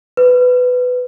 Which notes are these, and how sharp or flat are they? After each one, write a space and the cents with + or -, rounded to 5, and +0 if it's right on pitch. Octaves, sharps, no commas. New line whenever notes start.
B4 +15